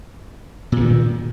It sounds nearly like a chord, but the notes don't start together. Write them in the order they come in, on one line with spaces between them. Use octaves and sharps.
A#2 G2 D#3